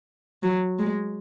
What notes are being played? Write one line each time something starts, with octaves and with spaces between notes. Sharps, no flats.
F#3
G#3